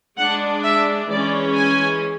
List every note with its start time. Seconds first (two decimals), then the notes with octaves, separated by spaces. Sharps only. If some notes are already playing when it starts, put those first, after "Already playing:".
0.18 G#3 D4 F#5
0.64 E5
1.10 E3 G#3 C#4 D5
1.56 G#5